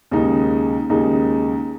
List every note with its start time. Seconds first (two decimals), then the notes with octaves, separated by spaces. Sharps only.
0.11 D#2 C#3 G#3 D#4
0.90 D#2 C#3 G#3 D#4